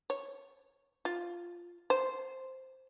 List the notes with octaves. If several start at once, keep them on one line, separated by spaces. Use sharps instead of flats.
C#5
F4
C5